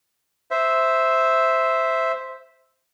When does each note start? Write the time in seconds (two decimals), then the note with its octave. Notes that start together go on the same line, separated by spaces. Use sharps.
0.51 C5 E5